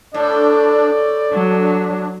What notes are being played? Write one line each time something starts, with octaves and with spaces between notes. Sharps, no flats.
A2 D4 D5
F#3 D4